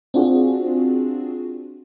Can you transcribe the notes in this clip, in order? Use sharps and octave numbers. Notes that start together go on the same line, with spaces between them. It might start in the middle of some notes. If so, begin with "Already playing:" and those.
C4 D4 F4 F#4 G#4